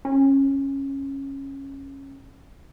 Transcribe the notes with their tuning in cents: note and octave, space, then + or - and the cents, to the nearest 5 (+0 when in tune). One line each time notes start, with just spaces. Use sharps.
C#4 -15